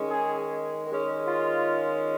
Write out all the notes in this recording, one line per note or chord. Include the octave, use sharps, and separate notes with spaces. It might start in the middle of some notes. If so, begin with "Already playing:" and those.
Already playing: D#3 G#3 C#4
G#4
D#3 G#3 C#4
F4